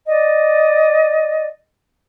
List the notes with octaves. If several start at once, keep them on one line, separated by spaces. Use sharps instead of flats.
D5 D#5